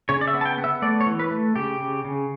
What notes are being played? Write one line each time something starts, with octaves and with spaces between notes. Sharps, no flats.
C#3 C#5
D5
E5
B3
A5
G5
B3
E5
A3 D5
C#5
E3
B4
A3
C#3 G4
C#3
C#3